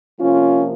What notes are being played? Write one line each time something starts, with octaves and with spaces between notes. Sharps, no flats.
C3 F3 A#3 C#4 F4